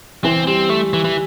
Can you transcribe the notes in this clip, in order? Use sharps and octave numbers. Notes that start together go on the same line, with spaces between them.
E3 C4
G3 C4
A3
E3
E3